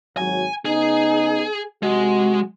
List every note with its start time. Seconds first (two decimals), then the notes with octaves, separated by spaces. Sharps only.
0.17 G#1 F#3 G#5
0.65 C#3 B3 D#4 G#4
1.83 C3 G#3 F#4